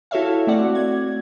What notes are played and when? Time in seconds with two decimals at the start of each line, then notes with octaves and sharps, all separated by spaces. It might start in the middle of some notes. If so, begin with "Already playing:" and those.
0.11 E4 F#4 A4 C#5 E5 F5
0.47 A3 C4 F#4 D5 F#5
0.75 G#6